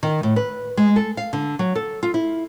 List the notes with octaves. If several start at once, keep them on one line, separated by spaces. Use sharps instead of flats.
D#3
A2
B4
G#3
A4
F5
D3
F#3
A4
F4
E4